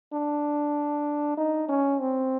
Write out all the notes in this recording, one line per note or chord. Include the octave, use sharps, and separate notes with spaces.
D4
D#4
C#4
C4